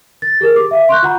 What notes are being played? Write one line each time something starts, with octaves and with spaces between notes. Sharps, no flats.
A6
G4 G#4 A#4
D6
E5 F5
C6 C#6 F#6 G6
F4 F#5 A#5 B5